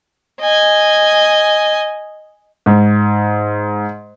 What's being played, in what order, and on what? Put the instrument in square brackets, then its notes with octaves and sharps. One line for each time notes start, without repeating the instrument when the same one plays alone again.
[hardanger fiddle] D#5 G#5
[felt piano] G#2